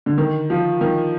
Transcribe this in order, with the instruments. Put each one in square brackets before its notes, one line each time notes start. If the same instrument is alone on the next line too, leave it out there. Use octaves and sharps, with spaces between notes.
[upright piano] D3
D#3
F3
D#3